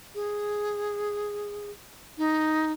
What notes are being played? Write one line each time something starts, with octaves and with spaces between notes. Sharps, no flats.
G#4
D#4